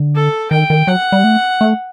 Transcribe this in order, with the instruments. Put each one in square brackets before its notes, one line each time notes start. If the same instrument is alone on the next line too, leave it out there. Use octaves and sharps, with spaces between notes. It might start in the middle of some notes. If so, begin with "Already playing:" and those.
Already playing: [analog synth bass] D3
[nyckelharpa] A4
[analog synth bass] D#3 [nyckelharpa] G5
[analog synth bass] D#3
[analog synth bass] F#3 [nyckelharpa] F#5
[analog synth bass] G3
A3
A3